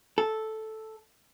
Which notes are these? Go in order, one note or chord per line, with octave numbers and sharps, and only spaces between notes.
A4